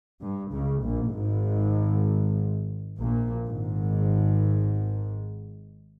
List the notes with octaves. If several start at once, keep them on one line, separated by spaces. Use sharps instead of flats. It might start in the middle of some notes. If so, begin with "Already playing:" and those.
G2
C#2 C#3
A#1 A#2
G#1 G#2
A#1 A#2
G#1 G#2